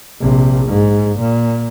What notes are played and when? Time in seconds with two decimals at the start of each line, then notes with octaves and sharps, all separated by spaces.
0.20 A#1 C3
0.69 G#2
1.20 A#2